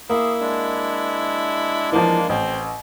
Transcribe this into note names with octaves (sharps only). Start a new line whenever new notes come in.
A#3 E4 G#4
G#3 D4
E3 F3 A#3
A1 C4